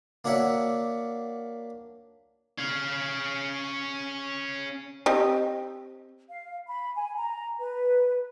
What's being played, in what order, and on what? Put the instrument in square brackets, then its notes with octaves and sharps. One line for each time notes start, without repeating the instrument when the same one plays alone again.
[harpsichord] A#3 D4 F#4 C#5 E5 F#5
[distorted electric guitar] C#4 F5
[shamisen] C4 G4 D#5
[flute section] F5
B5
G#5
A#5
B4